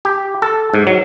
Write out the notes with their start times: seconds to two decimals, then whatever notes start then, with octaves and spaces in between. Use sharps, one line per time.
0.05 G4
0.42 A4
0.74 G#2
0.87 F#3